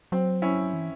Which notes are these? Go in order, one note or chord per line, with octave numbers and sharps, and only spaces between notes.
F#3 C4
C#4 E4
E3